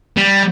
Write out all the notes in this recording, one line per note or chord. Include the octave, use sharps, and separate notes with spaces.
G3